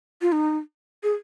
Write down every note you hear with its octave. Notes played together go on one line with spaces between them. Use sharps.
F4
D#4
G#4